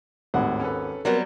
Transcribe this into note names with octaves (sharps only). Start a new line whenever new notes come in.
G#1 D#2 A2 F#5
C#4 A4 B4
F#3 G3 B3 C4 A#4